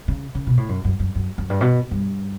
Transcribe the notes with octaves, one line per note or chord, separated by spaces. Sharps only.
C#3
C#3
B2
A2
F#2
F#2
F#2
F#2
F#2
G2
B2
G2